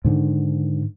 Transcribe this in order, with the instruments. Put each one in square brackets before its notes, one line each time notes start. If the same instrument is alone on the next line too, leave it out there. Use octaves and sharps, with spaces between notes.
[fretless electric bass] G#2 D3 D#3